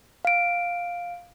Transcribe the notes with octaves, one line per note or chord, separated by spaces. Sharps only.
F5 D7